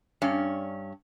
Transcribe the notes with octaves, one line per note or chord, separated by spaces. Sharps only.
G2 C#4